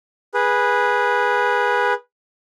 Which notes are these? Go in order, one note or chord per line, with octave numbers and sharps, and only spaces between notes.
G#4 B4